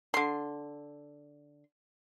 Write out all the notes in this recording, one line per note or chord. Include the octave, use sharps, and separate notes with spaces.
D3 C6